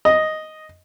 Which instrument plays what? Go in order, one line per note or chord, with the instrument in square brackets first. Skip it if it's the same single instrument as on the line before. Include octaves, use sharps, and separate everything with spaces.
[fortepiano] D#5